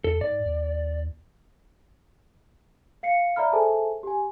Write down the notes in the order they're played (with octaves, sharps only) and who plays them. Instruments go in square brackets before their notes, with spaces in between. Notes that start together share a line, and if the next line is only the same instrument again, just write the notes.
[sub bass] E2 [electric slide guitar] A4
[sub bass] G#2 [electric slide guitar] D5
[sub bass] D#2
[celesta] F5 C7 C#7
D5 E5 A#5 B5 F6
G#4 A4 C5 E5 G#5 A5
G4 G#5